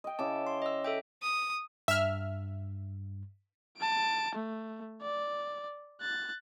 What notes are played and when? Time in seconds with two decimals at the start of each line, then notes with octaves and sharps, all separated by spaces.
0.04 D#5 G5
0.19 C#3 E4 A5 D6
0.47 C6
0.62 D#5 E6
0.84 A4 E5 G5
1.22 D#6
1.88 G2 E5 F6
3.78 A5 D7
4.35 A3
5.02 D5
6.01 F#6 A6